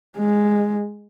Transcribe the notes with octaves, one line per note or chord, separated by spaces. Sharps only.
G#3